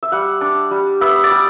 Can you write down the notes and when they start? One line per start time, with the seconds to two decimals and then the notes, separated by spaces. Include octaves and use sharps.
0.03 E5
0.12 G3 F#5
0.41 D4
0.71 G3
1.01 B3 E5
1.24 D5
1.31 G3